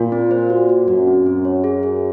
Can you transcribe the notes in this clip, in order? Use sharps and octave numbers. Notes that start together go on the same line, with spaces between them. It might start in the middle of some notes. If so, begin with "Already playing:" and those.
Already playing: A#2 F4
C4
C5
F#4
F#4
F#2 F#4
C4
C4
C#5
G#4
G#4